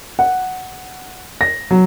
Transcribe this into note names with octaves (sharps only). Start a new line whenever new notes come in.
F#5
A#6
F#3